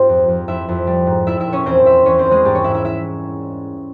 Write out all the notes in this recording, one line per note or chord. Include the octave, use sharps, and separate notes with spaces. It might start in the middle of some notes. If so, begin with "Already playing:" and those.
Already playing: G#2 C4 F4 G4 C5
F2
F2
F2 E4 E5
F2
G3
G#2
G3 E4 E5
E4 E5
A#2
C#4 C#5
E2 C4 C5
E2 E4 E5
E2 C#4 C#5
C4 C5
E2
G#3 G#4
G#2 G3 G4
C#4 C#5
G#2 E4 E5
E4 E5
E4 E5